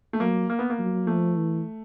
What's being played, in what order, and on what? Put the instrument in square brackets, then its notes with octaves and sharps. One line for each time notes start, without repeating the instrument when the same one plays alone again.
[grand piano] A3
[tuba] F#3 [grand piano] A#3
[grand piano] A#3
B3
A#3
[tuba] F#3
[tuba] F3 [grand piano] A3
[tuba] E3